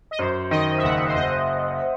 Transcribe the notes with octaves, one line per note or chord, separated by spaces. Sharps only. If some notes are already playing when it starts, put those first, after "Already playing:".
D#5
F#2 C5
D#3 D#5
E5
F#1 F#5
C5
F#1 D#5